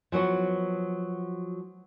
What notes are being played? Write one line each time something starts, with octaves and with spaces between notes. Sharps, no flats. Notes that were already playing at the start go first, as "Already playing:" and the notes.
F3 F#3 B3 F#4